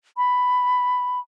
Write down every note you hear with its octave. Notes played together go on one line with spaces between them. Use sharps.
B5